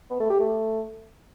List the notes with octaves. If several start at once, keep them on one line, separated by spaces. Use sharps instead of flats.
B3
A3
G4
A3